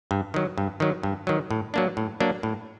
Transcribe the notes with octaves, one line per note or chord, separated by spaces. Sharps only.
G2
D#3 F#3
G2
D#3 F#3
G2
D#3 F#3
A2
F#3 A#3 D4
A2
F#3 A#3 D4
A2